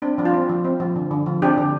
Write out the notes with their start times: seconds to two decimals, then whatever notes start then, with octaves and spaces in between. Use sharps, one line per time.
0.02 C4 D4
0.18 F3 D4
0.25 F4
0.34 C4
0.49 F3
0.64 C4
0.80 F3
0.96 D3
1.11 D3
1.26 F3
1.42 C4 D4 G4
1.58 D3